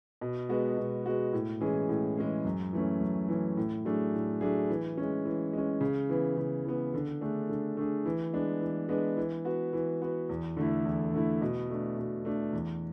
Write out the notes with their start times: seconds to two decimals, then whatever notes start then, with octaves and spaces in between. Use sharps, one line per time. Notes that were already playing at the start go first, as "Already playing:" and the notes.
0.21 B2
0.49 G#3 B3 F#4
0.77 B2
1.06 G#3 B3 F#4
1.33 A2
1.61 E3 G#3 C#4 G#4
1.89 A2
2.17 E3 G#3 C#4 G#4
2.45 F#2
2.73 E3 A3 C#4
3.01 F#2
3.29 E3 A3 C#4
3.57 A2
3.85 F#3 A3 D4 G#4
4.13 A2
4.41 F#3 A3 D4 G#4
4.69 E3
4.98 G#3 C#4
5.25 E3
5.53 G#3 C#4
5.81 C#3
6.09 E3 B3
6.37 C#3
6.65 E3 B3
6.94 D3
7.21 A3 D4 G#4
7.49 D3
7.77 A3 D4 G#4
8.06 E3
8.33 G#3 B3 D4
8.61 E3
8.89 G#3 B3 D4
9.17 E3
9.45 B3 F#4
9.73 E3
10.02 B3 F#4
10.29 E2
10.57 D3 A3 E4
10.85 E2
11.14 D3 A3 E4
11.42 B2
11.69 A3 D4
11.98 B2
12.25 A3 D4
12.53 E2